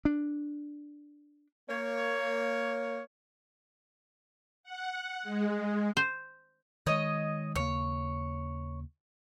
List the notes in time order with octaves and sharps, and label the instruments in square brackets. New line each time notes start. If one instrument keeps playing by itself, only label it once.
[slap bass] D4
[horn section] A#3 C#5
[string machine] F#5
G#3
[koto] C5
[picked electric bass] D#3 G#3 [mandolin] C#5 D#5
[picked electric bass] D#2 C#3 A#3 [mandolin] C#5